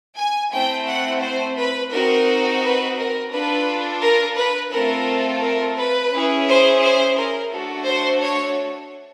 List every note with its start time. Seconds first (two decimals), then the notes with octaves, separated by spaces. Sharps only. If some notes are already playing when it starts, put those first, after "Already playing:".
0.17 G#5
0.52 A3 C4 E4 G5
0.88 F#5
1.22 C5
1.58 B4
1.93 C4 D#4 F#4 A#4
2.63 B4
2.98 A#4
3.32 D4 F4 A4 B4
4.02 A#4
4.37 B4
4.73 A3 C4 F4 A4 A#4
5.42 A#4
5.77 B4
6.12 C#4 E4 G#4
6.47 C5
6.82 C5
7.17 A#4
7.52 A3 D4 F#4 A4
7.86 C5
8.22 C#5